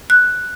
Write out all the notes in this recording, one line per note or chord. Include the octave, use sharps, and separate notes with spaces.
F#6